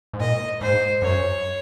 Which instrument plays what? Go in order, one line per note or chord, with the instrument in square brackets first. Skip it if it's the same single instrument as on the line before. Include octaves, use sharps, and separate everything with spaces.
[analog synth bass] G#2
[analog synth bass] A#2 [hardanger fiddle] D#5
[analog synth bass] G#2 [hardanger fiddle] C5
[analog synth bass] F#2 [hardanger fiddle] C#5